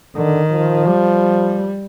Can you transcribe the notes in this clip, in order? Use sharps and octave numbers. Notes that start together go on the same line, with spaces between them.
D3 D#3
F3
G3